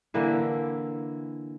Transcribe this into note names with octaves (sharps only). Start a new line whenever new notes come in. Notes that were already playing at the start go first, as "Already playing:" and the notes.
D3 E3 A#3 E4